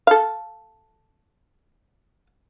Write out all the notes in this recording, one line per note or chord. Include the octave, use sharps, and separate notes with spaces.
A4 F5